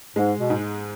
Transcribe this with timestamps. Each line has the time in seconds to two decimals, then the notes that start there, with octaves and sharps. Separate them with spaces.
0.16 G#2 G#3
0.38 B2
0.50 G#2